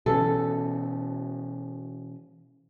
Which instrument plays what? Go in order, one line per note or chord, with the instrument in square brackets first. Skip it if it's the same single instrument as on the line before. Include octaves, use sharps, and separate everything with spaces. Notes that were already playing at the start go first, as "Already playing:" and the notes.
[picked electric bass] B2 E3 C#4 [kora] A4